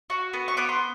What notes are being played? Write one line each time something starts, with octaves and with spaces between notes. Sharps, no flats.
F#4
B3
C#6
B3 D6
C6